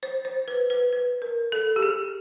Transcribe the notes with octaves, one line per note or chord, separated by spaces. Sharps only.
C5
C5
B4
B4
B4
A#4
A4
G4
G#4